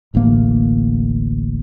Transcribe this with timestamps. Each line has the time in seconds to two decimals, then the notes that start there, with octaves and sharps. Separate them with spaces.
0.14 D1 A1 D2 A#3